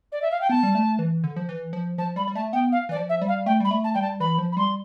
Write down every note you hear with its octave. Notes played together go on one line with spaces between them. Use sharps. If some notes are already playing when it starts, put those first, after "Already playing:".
D5
E5
F5
G5
B3 A5
G3
A3
E3
D3
F3
E3
F3
F3 A5
G3 B5
G3
A3 A5
B3 G5
F5
E3 D5
F3
E5
G3
F5
A3 G5
G3 B5
A3
A5
G3 G5
A5
E3 B5
F3
B5
G3 C6